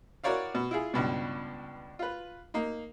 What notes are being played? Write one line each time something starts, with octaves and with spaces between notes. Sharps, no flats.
E4 F#4 A#4 C#5 D5 F5
B2
E4 F4 G#4
C#2 G2 B2
F4 B4
A#3 D#4